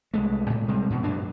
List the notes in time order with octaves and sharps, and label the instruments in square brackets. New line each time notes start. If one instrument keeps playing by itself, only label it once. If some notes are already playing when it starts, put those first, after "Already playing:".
[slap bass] C2 G#3 A3
A2
C3 G3 G#3
G#2 B2 E3
F#2 F#3 A#3 D4